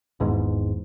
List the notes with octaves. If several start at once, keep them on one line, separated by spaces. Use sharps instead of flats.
G#1 E2 G#2